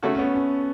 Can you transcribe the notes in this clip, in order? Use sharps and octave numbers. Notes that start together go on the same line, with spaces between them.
C#3 A3 F#4 A4
C#4
B3
C#4